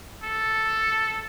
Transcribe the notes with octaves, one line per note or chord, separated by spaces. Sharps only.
A4